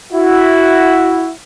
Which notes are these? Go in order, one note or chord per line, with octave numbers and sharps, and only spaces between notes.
E4 F#4